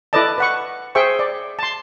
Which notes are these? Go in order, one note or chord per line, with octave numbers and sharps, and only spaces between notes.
E4 A4 B4 D5 D#5 A5
B4 F#5 C#6
G#4 C5 E5 G5 C#6
D5
A5 C6